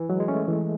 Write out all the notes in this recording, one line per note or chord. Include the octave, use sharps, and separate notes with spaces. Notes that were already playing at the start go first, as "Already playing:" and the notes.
Already playing: E3
F#3 G#3
G#3
A3 C#4
E3